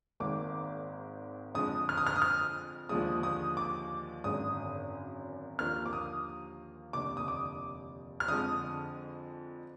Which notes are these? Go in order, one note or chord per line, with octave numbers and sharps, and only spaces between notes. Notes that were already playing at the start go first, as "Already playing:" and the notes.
G#1 G#2 D#3 A#3 D6
F2 D3 G#3 D4 D#6
F6
D#6
F6
D#6
F6
D#2 D3 F3 G#3 D#6
D#6
D6
G#1 F#2 D3 G#3 D#6
D#2 D3 F3 A#3 D4 F6
D6
D#6
F1 D#2 D3 D6
D#6
D6
F6
F2 D3 G#3 D4 D#6